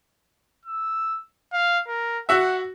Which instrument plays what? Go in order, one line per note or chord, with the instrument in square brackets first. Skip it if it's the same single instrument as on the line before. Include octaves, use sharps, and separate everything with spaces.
[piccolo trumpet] E6
F5
A#4
[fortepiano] F#4 E5 [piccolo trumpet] F#5